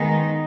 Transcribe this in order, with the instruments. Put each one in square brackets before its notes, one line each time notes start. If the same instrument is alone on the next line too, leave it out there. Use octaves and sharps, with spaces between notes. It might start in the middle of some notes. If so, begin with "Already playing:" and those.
Already playing: [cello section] D#3 G#3 B3 D#4